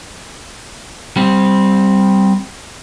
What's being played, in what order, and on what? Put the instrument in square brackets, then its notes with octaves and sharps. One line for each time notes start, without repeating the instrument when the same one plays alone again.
[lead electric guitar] G3 C4